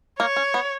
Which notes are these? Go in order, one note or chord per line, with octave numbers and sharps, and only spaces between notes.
A#3 C#5
C#4
B3